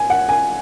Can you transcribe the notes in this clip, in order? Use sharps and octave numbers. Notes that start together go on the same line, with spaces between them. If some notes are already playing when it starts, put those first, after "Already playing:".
Already playing: G#5
F#5
G#5